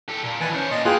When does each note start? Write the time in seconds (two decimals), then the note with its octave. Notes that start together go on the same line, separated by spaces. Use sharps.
0.09 G4 A4
0.23 A#2
0.41 D#3 E3 B4 G#5 A5
0.55 C#4 C5 C#5
0.71 A#2 D#5 A5 C6
0.85 A#3 F4 G#4 B4 G5 G#5 F#6